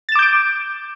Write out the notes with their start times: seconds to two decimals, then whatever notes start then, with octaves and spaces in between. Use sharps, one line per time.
0.09 A6
0.12 E7
0.15 D6
0.19 G6
0.22 D7